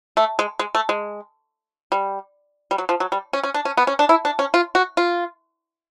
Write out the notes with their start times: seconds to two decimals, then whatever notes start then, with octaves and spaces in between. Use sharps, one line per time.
0.17 A3
0.39 G#3
0.59 G#3
0.75 A3
0.89 G#3
1.92 G3
2.71 G3
2.78 F#3
2.89 F3
3.00 F#3
3.12 G3
3.33 C#4
3.43 C#4
3.54 D4
3.65 C#4
3.77 B3
3.87 C#4
3.99 D4
4.09 E4
4.25 D4
4.39 C#4
4.54 F4
4.75 F#4
4.97 F4